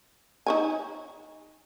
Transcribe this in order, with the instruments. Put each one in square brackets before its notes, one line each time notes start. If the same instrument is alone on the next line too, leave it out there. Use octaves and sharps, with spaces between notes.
[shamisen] D#4 C#5 G#5